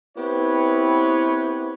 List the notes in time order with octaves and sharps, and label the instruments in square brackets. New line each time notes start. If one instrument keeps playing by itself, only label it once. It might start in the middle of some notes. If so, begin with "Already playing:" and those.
[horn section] B3 C4 E4 G4 B4 C#5